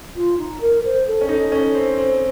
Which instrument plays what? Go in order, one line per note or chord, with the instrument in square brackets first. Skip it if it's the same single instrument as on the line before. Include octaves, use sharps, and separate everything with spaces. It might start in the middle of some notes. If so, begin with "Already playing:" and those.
[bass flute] F4
D#4
A#4
C5
A4
[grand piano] C#4
[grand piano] D#4 [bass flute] A4
[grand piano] C#4
C4
C4